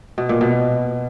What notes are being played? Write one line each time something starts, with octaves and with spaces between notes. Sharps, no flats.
B2
A#2
B2